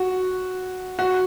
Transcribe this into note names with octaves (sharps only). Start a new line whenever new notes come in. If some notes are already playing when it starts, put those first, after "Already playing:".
Already playing: F#4
F#4